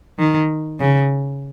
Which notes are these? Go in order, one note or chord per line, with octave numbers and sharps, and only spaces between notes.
D#3
C#3